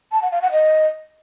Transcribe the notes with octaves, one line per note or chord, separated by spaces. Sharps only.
A5
F#5
F5
F#5
D#5